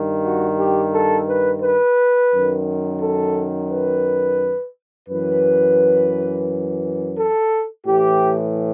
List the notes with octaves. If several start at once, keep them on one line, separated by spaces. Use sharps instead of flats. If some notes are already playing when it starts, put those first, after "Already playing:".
Already playing: G2 D#3
F#4
G4
A4
B4
B4
F#2 D#3
A4
B4
F#2 E3 B4
A4
A2 E3 G4